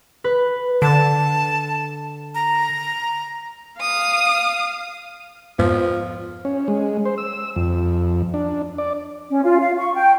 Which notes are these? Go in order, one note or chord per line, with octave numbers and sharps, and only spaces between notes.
B4
D3 A5
A#5
F5 D#6
F2 G#2 F3 B3
C#4
G#3
C5
E6
F2
D4
D5
C#4
F4
F5
C#6
G5